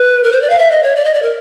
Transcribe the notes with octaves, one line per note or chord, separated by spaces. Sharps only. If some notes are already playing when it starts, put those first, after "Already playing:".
Already playing: B4
A#4
C5
D5
F5
E5
D#5
C#5
D5
D#5
D5
A#4